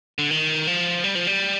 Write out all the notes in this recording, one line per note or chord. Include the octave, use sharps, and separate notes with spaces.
D3
D#3
F3
G3
F3
G3